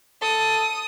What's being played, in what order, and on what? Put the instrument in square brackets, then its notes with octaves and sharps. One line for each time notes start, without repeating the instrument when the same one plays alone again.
[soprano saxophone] A4 [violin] D#6